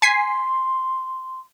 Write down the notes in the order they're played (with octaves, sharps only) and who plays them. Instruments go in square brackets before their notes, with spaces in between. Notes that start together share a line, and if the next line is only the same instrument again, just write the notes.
[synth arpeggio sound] G#5 B6 C7 [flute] C6